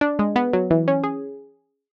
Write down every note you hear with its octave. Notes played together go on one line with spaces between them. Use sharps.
D4
G#3
B3
F#3
E3
C#4
G#4